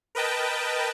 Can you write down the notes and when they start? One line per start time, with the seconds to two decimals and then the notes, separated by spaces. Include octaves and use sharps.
0.15 A#4 B4 D#5 G5 A5